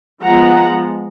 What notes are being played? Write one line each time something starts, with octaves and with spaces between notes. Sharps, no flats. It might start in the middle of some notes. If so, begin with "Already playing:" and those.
F3 G#3 B3 F#5 A#5